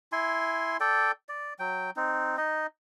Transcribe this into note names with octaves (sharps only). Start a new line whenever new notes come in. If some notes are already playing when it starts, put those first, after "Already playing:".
E4 G#5 C6
A4 D5 G5
D5
F#3 G5
C4 D#4
D#4 D#5